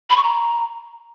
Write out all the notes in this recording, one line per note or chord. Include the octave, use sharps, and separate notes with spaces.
B5
C#6
A#5